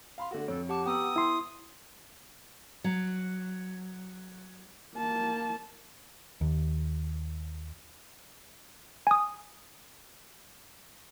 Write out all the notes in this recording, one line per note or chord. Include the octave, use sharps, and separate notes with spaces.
F5 B5 C6
D3 A3 F#4
F2 A4 C#5
G4 F#5 A5 D6
B3 F#5 G5 A#5 D#6 E6
E4 C6
F#3
A#3 A5
D#2
G#5 D#6